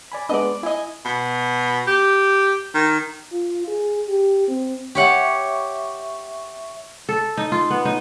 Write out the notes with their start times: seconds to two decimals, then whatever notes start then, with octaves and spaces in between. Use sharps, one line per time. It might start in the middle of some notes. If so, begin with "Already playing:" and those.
0.12 D5 G#5 B5
0.29 G#3 B3 D4 D5 D#5
0.63 E4 D#5 G#5
1.05 B2
1.87 G4
2.74 D#3
3.32 F4
3.67 G#4
4.08 G4
4.48 C4
4.95 G4 C#5 E5 F#5 C#6
7.09 A4
7.37 D#4
7.52 F4
7.70 B3
7.85 D#4